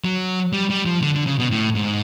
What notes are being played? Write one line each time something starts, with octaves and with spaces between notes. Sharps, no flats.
F#3
G3
G3
F3
D3
D3
C#3
B2
A2
G#2